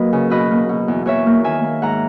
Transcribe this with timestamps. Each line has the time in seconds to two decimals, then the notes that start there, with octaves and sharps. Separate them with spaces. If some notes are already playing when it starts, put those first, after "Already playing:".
Already playing: F#3 A#3 B4 D#5
0.13 C#3
0.30 B2 B4 D#5
0.51 A#3
0.69 B2
0.88 E2
1.06 E2 C#5 E5
1.26 A#3
1.44 D#3 E5 G#5
1.64 A#3
1.82 G#2 F#5 A#5